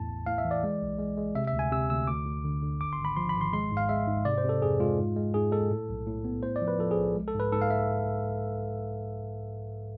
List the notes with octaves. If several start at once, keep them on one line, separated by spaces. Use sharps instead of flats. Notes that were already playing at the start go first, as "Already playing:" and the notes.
Already playing: E2 A2 A5
A1
A2 F5
E5
E3
D5
G#3
B1
G#3
G#3
C3 E5
E5
D2
G#5
C3 E6
D2 E6
D2 D6
D2
D3
D3
G#1 D6
C6
G#1
B5
F3 C6
B5
G#1
C6
G#3 C6
G#2
F5
G#3 E5
G#2
C3 D5
C5
C3
A4
F2 G#4
G#3 F4
G#2
G#3
G#2 G#4
G#3 A4
A2
B1
A2
B3
A2 C5
D5
F3
B4
F3 A4
G#4
B1
G#3
A4
G#2
B4
G#2 A4
F5
E5